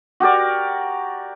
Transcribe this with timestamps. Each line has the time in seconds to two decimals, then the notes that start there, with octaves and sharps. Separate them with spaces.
0.20 F#4 G4 A#4 D5